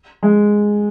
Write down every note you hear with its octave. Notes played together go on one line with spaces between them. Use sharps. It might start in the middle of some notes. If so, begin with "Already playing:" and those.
G#3